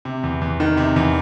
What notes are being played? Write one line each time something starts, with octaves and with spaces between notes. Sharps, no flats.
C3
E2
E2
D#3
C3
E2